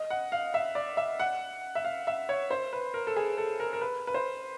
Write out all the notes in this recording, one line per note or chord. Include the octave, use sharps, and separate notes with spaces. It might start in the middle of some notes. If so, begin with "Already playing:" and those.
Already playing: D#5
F#5
F5
E5
D5
E5
F#5
E5
F5
E5
C#5
C5
B4
A#4
A4
G#4
A4
A#4
A#4
B4
B4
C5